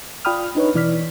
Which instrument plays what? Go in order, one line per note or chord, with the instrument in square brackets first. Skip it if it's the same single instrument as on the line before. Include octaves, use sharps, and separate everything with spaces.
[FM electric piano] F4 D5 G5 B5 D#6 F6
D4 D#4 B4 C#5
B2 E3 D5 F6 B6